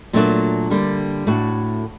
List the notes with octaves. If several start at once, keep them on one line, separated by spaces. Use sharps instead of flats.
A#2 F#3 A3 D4 F#4
D3 G3 A#3
A2 A3 D4 F#4